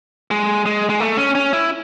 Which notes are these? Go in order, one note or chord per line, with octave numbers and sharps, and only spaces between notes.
G#3
G#3
G#3
A3
C#4
C#4
E4